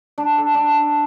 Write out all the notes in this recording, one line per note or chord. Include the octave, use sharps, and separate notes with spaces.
D4
A4
D4